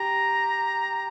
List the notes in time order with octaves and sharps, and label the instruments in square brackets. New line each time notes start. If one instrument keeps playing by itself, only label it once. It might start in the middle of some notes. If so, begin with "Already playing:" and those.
Already playing: [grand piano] G4 [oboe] A#5